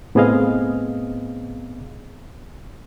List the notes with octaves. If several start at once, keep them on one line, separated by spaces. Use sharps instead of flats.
A2 B3 C4 G#4 D#5 F5